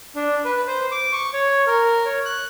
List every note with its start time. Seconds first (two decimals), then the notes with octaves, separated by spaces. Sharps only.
0.16 D4
0.45 B4
0.67 C5
0.92 D6
1.13 C#6
1.34 C#5
1.67 A#4
2.06 C#5
2.25 F#6